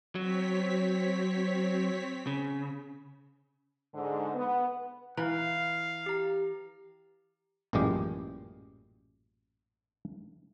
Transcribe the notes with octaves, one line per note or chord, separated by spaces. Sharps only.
F#3 C4 C#5 B6
C#3
G#2 D3
B3
E3 F5 A#5
G4 A#5
A1 F#2 A#2 E3 G#3 G4